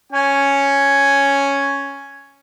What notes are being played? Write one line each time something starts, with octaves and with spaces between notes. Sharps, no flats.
C#4 G#5